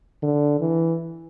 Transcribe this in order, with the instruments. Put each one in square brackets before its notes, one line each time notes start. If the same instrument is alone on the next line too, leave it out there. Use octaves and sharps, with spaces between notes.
[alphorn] D3
E3